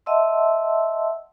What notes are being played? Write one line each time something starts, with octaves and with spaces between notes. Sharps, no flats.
D#5 E5 F#5 A5 C6 E6